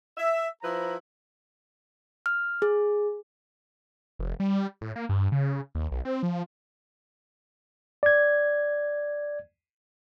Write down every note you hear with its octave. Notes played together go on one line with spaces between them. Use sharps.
E5
F3 E4 B4 C5 A#5
F6
G#4
F1
G3
A2
A#3
G2
C#3
D#2
B1
C4
F3
D5 G#6